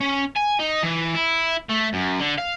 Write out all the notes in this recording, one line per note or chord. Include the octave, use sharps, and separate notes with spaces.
C#4
G#5
D#4
E3
E4
A3
F#2
D3
F5